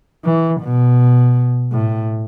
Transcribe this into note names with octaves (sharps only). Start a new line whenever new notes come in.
E3
B2
A2